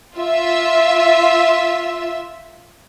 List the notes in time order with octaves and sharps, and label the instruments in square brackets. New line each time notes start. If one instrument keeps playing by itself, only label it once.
[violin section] F4 E5